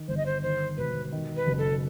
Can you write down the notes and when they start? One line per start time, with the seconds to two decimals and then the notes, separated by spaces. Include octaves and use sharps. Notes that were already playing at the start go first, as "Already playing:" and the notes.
Already playing: D#3
0.08 G1 C5
0.17 D#5
0.26 C5
0.43 D#3 C5
0.77 E1 B4
1.12 D#3
1.36 B4
1.47 F#1
1.58 A4